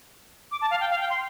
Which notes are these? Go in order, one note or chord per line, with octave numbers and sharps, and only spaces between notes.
D6
A5
F5
G5
F5
G5
C6